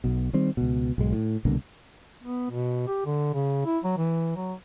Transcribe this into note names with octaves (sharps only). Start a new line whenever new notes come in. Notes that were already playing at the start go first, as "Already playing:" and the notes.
B1 B2
D#3 G3 C4
C#2 B2
B1 G#2 G#3
A2
C2 B2 D3 A#3
B3
B2
G4
D3
C#3
E4
F#3
E3
F#3